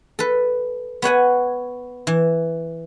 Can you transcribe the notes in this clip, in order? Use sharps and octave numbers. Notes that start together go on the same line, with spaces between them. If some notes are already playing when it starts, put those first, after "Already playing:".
A4 B4
B3 C#5 F#5 G#5
E3